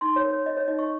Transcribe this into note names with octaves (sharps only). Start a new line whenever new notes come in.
D#4 C6
C#5
A#4
C#5
C#5 D#5
C#5
D#4 D#5
C#6